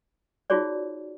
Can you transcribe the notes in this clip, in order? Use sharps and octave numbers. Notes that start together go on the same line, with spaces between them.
D#4 F4 F#4 G#4 C#5 D5